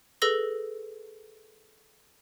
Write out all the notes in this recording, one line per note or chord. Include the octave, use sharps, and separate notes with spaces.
G#4 A4 B4 E6 A#6 G7